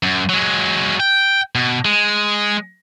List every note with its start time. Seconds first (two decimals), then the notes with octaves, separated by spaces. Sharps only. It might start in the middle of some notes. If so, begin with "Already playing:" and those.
0.03 F#2
0.29 F#3 G#3
1.00 G5
1.55 B2
1.85 G#3